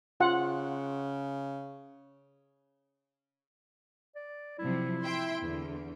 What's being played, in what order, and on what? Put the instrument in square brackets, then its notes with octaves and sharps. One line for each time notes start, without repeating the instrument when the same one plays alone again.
[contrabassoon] C#3 [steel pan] F4 F#5
[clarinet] D5
[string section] C3 F3 F#3 [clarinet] E4
[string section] E5 G5 C6
E2 D3